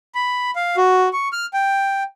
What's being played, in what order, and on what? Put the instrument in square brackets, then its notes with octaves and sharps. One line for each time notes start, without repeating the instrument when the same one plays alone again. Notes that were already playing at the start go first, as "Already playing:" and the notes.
[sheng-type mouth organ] B5
F5
F#4
C#6
F6
G5